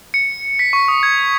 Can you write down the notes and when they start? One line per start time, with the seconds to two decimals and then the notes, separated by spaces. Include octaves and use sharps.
0.14 C#7
0.59 B6
0.73 C#6
0.88 D#6
1.03 G#6